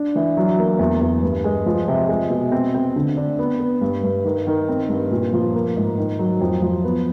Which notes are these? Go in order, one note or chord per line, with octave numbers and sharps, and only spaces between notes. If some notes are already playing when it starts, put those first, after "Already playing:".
Already playing: D4
E3
F#3
A#3
E2
E2
G2
G#3
F3
C3
G#3
B2
C4
C4
D3
D4
B3
B3
G2
G2
D#3
D#3
C4
G2
A#2
F3
A#3
G#2
D#3
F#3
F2
F3
B3